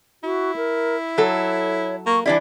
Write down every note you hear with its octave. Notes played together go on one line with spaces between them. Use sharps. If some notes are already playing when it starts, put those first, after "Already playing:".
E4 F#4
A#4
F#3 A4 C#5
A#3 C#6
E3 G3 D4 E4 D5